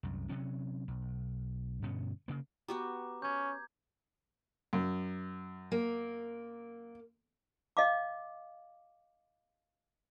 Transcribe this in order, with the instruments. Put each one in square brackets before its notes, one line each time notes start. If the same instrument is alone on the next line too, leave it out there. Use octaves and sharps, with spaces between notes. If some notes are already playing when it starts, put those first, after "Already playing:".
[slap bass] C2 F#2
C3 F#3 C#4
B1
G2 B2 D3 C#4
C#3 A#3
[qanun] B3 F#4 G4 [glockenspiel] A#5 D6
[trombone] C#4 [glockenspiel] G6 G#6
[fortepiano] F#2
[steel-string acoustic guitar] A#3
[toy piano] D#5 F5 D6